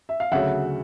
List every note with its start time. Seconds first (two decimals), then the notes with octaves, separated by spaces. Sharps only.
0.09 E5
0.20 F5
0.32 D2 C#3 F#3 E5 F#5